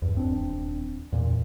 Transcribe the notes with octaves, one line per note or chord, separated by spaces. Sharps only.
E2 G2
D#1 C4 D4
E2 A#2